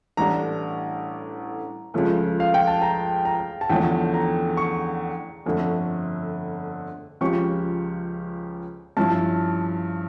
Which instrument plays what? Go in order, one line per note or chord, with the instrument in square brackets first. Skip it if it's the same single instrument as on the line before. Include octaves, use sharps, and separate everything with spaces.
[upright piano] A1 A2 G3 D4 [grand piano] A#5
[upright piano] C#2 C#3 F3 A3
[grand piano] F5
G5
A5
A#5
A#5
A5
[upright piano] E2 D3 F3 A3 C#4 [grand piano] G5
[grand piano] A#5
C#6
[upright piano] G1 F2 D3 A3
[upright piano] C#2 C#3 F3 C#4 G4 [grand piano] C#6
[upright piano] G2 F3 C#4 E4 [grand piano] A5